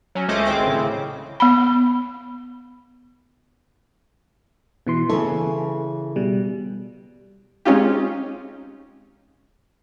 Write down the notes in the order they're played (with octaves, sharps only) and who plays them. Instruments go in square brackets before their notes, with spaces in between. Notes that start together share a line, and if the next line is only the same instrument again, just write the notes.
[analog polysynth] F#3 C#4
C#2 A3 C#4 C5 D#5 D6
G#1 G#3 C4 D6
A2 C#3
[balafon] B3 B5
[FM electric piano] B2 E3 C6
[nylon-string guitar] C#3 E3 C#5 [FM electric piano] A4
[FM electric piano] B2 G3
[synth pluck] G#3 C4 C#4 D#4 F4 G4